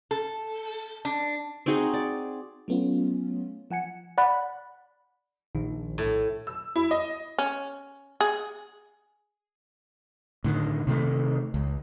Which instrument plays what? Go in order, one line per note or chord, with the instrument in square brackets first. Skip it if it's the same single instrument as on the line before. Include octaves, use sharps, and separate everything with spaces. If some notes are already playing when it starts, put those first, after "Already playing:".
[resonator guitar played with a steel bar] A4
D4
[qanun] C4 D#4 F#4 G#4
D5
[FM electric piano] F#3 A3 B3 C#4 F4
F3 F#5 G#5 C#7
[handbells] D5 F#5 B5 F#6
[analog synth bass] A#1 [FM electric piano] D#3
[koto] A2
[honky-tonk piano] E6
E4
D#5
[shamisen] C#4
G#4
[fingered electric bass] A2 D3 D#3
C3 D#3 A3
C#2